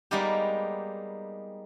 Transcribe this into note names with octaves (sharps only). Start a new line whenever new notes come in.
G3 G#3 A#3 B3 D#4 G4